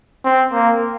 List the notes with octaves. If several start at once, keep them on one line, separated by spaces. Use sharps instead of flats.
C4
A#3